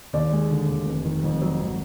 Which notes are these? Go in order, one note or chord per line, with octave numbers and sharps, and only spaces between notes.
D#2 D5
G#3
D3
D#2
F1
D#3
F2
F#3
G#1